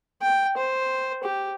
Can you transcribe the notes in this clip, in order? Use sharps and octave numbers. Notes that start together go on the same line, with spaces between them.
G5
C5
G4